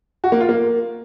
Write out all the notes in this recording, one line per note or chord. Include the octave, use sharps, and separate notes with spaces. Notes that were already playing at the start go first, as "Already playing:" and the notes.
F#4
A#3
F4
A#3